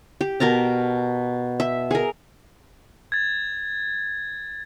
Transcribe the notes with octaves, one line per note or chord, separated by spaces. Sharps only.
G4
B2 A#4 A5 A#5
E5
G#4 A#4
G#6 A6